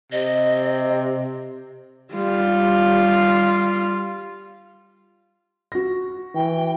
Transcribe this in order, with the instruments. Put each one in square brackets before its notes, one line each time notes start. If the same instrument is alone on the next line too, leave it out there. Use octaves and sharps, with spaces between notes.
[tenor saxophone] C3 [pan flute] D#5
[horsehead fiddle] G3 F4
[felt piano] F#4 A#6
[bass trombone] E3 [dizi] G5